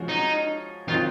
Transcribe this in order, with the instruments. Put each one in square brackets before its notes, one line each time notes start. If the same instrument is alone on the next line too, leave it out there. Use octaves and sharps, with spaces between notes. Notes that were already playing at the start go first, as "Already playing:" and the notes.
Already playing: [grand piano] F3 G#3 C#4 F#4
[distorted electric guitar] D#4
[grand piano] D#3 F#3 C4 D#4 [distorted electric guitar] F4